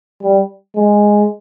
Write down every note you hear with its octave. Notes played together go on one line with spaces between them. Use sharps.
G3
G#3